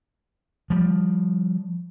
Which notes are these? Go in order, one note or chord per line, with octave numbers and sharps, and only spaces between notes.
F3 G3